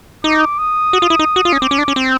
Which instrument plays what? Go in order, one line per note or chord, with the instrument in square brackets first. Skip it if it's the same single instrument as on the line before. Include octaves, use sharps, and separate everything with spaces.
[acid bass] D#4 [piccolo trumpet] D6
[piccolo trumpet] D#6
[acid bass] F#4
F4
E4
D#4
F#4
F4
C#4
[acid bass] C4 [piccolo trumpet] D6
[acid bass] C#4
D4
C#4
C4